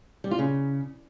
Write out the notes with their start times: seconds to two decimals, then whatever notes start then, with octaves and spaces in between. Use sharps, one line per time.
0.24 G3
0.31 F4
0.39 C#3